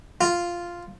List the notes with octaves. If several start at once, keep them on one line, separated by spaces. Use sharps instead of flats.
F4